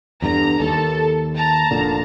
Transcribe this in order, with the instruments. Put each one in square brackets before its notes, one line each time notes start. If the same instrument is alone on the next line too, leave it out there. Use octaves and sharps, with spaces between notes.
[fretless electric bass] E2 G2 D3 [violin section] A#5
[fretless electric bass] D#2 [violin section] A4 A5
[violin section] A5 A#5
[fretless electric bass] F1 A#2 D3